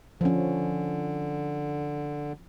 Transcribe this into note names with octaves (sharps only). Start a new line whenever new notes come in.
D3 F3 C#4